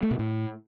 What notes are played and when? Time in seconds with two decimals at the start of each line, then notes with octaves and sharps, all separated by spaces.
0.03 A3
0.11 B2
0.19 A2